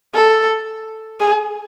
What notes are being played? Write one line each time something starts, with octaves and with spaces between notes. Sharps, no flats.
A4
G#4